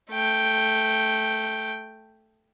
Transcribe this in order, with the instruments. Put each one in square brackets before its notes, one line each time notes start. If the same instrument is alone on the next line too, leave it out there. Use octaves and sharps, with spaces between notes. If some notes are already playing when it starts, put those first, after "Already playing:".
[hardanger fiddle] A3 G5